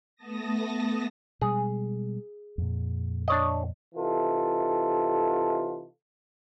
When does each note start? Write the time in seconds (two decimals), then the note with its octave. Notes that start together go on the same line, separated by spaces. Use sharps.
0.16 A3 B3 A5 D#6 A#6
1.41 B2 G3 G#3 G#4
2.58 F2 A#2
3.28 D4 C#5 D#5
3.95 C3 E3 D#4 F4 A4